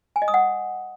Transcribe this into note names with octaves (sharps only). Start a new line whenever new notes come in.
G#5
D#5
D#6
F#5